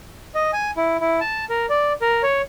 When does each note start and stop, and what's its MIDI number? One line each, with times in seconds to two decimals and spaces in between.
0.35 0.51 75
0.53 0.71 80
0.77 0.97 64
1.00 1.20 64
1.21 1.45 81
1.50 1.66 70
1.70 1.93 74
2.01 2.22 70
2.23 2.42 73